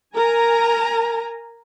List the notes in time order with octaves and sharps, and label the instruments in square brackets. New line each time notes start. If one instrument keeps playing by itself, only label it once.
[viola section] A#4 G#5 A#5